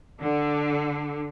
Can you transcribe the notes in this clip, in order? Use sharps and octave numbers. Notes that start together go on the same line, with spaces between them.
D3